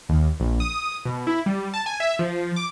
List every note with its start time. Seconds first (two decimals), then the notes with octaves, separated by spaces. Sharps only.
0.09 D#2
0.40 A#1
0.60 D#6
1.05 B2
1.27 E4
1.46 G3
1.74 A5
1.86 G#5
2.00 E5
2.19 F3
2.56 D6